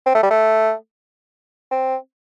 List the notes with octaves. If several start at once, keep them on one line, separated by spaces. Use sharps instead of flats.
C4
A3
G3
A3
C4